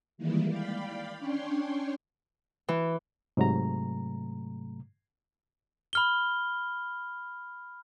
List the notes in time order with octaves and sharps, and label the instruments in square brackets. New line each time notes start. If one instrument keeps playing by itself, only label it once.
[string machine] D#3 E3 G3 G#3 A#3 E4
D5 F5 G5 B5
C#4 D4 C#5 G5 C6
[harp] E3
[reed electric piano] G#2 C3 F#3 A3 A#5
[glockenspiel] B5 F6 G7